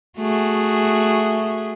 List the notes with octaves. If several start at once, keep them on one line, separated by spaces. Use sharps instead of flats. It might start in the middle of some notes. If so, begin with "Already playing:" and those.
A3 F#4 G#4